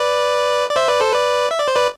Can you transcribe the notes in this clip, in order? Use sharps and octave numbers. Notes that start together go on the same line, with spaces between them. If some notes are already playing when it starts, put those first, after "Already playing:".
Already playing: B4 D5
D5
C5 E5
B4 D5
A4 C5
B4 D5
E5
D5
C5
B4 D5